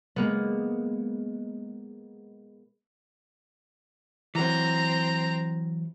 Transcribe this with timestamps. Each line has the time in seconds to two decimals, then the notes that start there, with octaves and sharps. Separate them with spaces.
0.16 G#3 A#3 B3
4.35 E3 F#3 C4 A#5